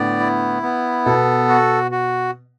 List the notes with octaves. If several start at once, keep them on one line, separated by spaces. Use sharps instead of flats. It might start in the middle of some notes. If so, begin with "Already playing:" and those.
Already playing: A2 D3 B3 D5
E4
B3
B2 A4
F#4
F#4